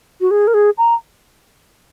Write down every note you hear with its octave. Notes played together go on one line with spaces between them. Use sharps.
F#4
G#4
A#4
G#4
A#5